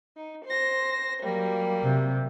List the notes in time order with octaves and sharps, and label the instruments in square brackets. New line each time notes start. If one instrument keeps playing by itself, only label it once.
[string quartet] D#4
C5 A#6
F#3 G3 A#3
[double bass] C3